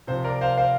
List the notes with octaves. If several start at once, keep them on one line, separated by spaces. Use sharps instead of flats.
C3 F3 C5
A#4 D5
C5 F5
C5 F5